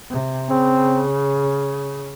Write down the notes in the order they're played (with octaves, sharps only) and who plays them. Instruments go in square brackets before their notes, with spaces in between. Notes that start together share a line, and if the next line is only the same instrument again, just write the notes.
[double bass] C3
[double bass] C#3 [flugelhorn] C4